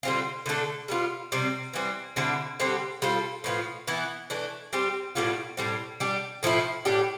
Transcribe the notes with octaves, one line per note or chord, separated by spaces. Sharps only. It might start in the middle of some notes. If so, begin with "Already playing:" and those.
D3 G3 C4 F4
D3 A3 D4 A4
G3 B3 F4
C3 G3 C4
E3 G3 C4
D3 G3 C4 E4
D3 G3 C4 G4
G3 C4 F4 A4
A2 F3 B3 F4
E3 B3 E4
E3 A3 D4
G3 C4 G4
A2 G3 B3 F4
A2 G3 C4
G3 D4 G4
A2 F3 A3 E4
A2 G3 D4 G4